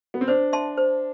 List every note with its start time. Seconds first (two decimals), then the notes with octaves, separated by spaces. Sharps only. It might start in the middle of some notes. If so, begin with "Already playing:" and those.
0.14 B3
0.21 C4
0.28 D4 C5
0.53 E5 A5 C6
0.78 C5